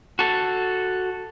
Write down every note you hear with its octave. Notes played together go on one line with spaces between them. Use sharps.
F#4 A4